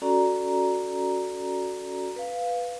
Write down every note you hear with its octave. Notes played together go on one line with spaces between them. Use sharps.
C#4 F#4 A4 D5 A#5
B4 F5